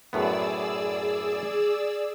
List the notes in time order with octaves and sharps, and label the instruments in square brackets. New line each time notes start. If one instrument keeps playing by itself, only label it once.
[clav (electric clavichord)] F#2 A2 B3 [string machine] G#4 D5 E6